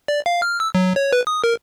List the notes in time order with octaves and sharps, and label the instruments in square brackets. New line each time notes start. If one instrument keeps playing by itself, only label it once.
[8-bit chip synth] D5
F5
F6
E6
F#3
C#5
B4
D#6
A#4